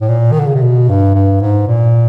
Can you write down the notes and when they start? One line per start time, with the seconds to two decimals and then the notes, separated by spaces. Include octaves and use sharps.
0.01 A2
0.09 A#2
0.32 D#3
0.40 D3
0.46 C#3
0.54 C3
0.62 B2
0.89 G2
1.14 G2
1.41 G#2
1.67 A#2